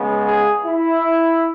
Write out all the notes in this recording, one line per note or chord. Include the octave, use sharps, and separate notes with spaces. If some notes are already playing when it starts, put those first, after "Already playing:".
Already playing: C#3 G#3 B3
G#4
E4